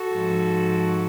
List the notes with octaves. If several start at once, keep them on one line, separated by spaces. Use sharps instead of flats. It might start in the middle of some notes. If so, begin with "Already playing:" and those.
Already playing: F#4 A4
G#2 F3